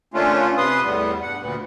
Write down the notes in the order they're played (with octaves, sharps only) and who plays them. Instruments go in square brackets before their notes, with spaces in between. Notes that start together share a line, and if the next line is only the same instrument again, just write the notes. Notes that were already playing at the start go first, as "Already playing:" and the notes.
[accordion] D3 A3 A#3 C#4 D4 F4
C3 B4 C6 D#6
E2 A2 G3 B3
G2 F#5
D2 A#2 B3